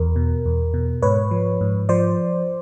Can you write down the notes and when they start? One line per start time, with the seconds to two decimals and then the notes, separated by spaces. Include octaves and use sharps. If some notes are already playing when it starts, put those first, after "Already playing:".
Already playing: E2 A#4
0.16 B2
0.46 E2
0.74 B2
1.02 G#2 B4 C#5
1.31 F3
1.61 G#2
1.89 F3 C5 D5